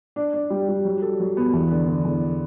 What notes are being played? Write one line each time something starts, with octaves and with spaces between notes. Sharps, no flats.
D4
D4
G3
G3
F#3
A4
F#3
B3
E2
D3
D3
E2